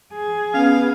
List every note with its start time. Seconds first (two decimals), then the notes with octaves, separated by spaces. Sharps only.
0.13 G#4
0.54 B3 C#4 F5